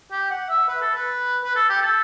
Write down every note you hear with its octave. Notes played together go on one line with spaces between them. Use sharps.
G4
F#5
E5
B4
A4
B4
B4
A4
G4
A4